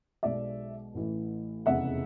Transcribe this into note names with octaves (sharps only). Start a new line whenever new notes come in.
B1 B2 G#3 D5 E5
A1 A2 E3
F1 E2 C#3 E5 F#5